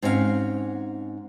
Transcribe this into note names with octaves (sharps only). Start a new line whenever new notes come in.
G#2 C4 C#4 F#4 G#4 F5